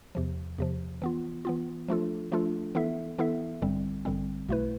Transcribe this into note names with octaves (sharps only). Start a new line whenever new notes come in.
E2 C3 F3
E2 C3 F3
E3 B3 F4
E3 B3 F4
F3 A3 D4 F4 A4
F3 A3 D4 F4 A4
E3 B3 E4 A4 E5
E3 B3 E4 A4 E5
A1 G2 D3 G3 C4
A1 G2 D3 G3 C4
B1 B2 A3 E4 B4